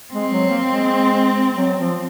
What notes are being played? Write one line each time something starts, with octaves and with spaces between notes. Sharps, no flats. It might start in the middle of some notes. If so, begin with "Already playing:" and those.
G#3 C4
F#3
A#3
G#3
F#3
F3